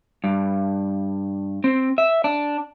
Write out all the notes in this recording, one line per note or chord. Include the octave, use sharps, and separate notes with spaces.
G2
C4
E5
D4